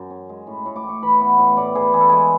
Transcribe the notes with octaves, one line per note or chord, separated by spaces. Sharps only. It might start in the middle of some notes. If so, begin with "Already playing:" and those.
Already playing: F#2
C#4
G#3
A2
A2
D6
A2 C#6
E3 B5
B3
A2
A2 D5
E3 G#4
E3 G#4
A4
G#3 G#4